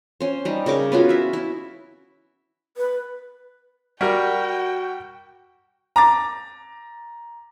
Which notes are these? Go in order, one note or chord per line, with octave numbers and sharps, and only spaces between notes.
C#4 C5
G3 D#4
C#3 A#4 C#6 D6
B3 C#4 F4 F#4
E4 E5
E4
B4
G3 F#4 A#4 G5
A#5 D6 A6